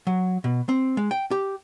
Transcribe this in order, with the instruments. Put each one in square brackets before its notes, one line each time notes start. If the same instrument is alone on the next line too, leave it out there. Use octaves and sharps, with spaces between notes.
[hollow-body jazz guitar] F#3
B2
C4
G#3
G5
G4